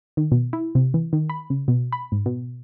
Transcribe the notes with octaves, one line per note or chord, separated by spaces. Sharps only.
D#3
B2
E4
C3
E3
D#3
B5
C#3
B2
B5
G#2
B2